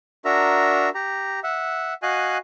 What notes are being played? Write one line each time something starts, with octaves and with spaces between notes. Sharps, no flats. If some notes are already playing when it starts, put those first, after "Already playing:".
D4 F#4 A#4 E5 A#5
G4 A#5
E5 F#5
F#4 D#5 F5 G#5 F#6